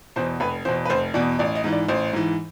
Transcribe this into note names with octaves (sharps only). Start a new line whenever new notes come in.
E2 B2 C5
F1 B4
E2 B2 C5
B4
F1 C5
E2 B2 D5
A1 D5
D#5
G#2 E3
D5
A1 C5
G#2 E3